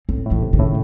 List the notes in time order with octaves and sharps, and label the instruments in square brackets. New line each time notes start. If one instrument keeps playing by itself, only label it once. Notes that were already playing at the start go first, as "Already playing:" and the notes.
[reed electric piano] A2 [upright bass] C4
[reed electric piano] A2
[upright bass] E3
[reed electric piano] C3
[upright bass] D#3
[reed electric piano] A2 C#3